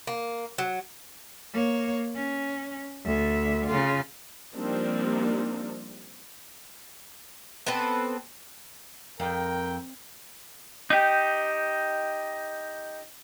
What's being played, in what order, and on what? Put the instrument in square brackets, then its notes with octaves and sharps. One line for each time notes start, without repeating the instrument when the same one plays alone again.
[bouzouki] A#3
F#3
[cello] A#3 C#5
C#4
D2 E5
C#3 F4
[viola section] F3 G3 A#3 C4 D4 D#4
[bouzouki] B3 C4 A4 B4
[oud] F2 [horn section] A#4 G5
[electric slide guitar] D#4 G4